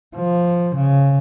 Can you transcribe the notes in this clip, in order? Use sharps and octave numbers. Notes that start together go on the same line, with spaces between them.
F3
C#3